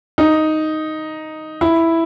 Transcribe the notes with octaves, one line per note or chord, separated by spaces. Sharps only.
D#4
E4